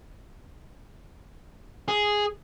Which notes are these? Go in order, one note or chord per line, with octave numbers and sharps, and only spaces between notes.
G#4